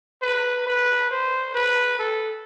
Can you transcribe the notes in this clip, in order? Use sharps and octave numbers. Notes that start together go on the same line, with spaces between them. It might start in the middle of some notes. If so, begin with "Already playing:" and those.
B4
B4
C5
B4
A4